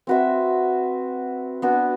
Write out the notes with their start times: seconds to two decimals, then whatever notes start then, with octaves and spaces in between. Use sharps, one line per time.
0.07 C4 F#4 B4 E5
1.62 B3 D4 F#4 B4